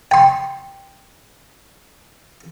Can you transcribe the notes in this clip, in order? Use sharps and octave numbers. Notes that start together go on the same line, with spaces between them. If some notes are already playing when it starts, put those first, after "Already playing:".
G5 C6